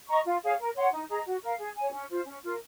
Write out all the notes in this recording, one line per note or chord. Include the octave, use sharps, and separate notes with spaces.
D#5 A#5 C#6
F4
G#4 C#5 F5
A#4
C#5 F#5 C6
D#4
G#4 D#5 A#5
F#4
A#4 F5
G#4
C#5 G#5
C#4
F4 C5
C#4
F4 A#4